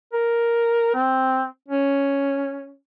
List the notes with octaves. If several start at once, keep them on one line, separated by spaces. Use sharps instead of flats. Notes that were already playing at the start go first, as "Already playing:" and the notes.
A#4
C4
C#4